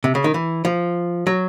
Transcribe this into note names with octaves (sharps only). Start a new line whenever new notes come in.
C3
C#3
D#3
E3
F3
F#3